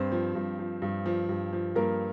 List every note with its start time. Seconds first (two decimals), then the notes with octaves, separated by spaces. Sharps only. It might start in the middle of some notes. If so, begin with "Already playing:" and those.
Already playing: G2 C4 C5
0.12 F3
0.35 G2
0.59 F3
0.82 G2
1.06 F3
1.29 G2
1.53 F3
1.76 G2 A#3 A#4